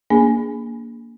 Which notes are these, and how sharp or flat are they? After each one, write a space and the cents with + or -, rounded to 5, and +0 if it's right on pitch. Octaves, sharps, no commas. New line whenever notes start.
A#3 +0 D4 -25 G#4 +0